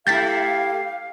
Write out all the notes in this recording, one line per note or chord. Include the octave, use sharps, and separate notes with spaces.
A3 E4 G4 F5 G6 A6 B6